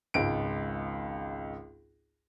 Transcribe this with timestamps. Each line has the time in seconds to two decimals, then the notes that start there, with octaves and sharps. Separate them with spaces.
0.14 G#1 C#2 D7